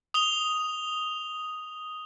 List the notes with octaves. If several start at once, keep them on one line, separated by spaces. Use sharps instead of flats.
D#6 F7 G7